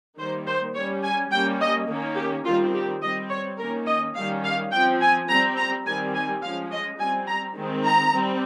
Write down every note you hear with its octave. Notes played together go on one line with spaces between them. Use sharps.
D#3 G3 A#3 C5
C5
G3 C#4 C#5
G#5
G3 A#3 C#4 G5
D#5
D#3 A#3 C#4
G4
D#3 G3 C4 F4
G4
G3 C4 D#5
C#5
D#3 A#3 C#4 A#4
D#5
D#3 G3 C#4 F5
F5
F3 C4 G5
G#5
G3 C4 A#5
A#5
D#3 G3 C4 G#5
G#5
F3 G#3 C#4 F5
D#5
G3 C4 G#5
A#5
D#3 G#3 C4
A#5
G3 C4